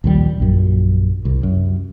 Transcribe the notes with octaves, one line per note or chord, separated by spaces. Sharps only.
A#1 D#2 G3
A#1 F#2
C2
F#2